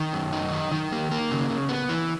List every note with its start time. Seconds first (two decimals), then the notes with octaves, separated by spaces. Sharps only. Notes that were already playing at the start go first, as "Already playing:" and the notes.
Already playing: D#3
0.13 F#2
0.33 D#4
0.53 D#3
0.72 D#3
0.92 A#3
1.11 A#3
1.31 C#3
1.50 C#3
1.69 B3
1.89 E3